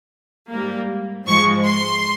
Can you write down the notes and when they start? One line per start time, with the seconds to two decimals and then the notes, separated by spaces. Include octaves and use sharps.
0.51 G#2 G3 A#3
1.27 G#2 F3 G#3 C#6
1.65 C6